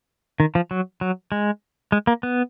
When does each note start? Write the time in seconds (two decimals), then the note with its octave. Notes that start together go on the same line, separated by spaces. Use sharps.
0.40 D#3
0.55 F3
0.71 F#3
1.01 F#3
1.32 G#3
1.92 G#3
2.07 A#3
2.23 B3